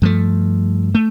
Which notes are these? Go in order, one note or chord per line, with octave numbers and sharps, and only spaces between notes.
G2 F3 A3
A3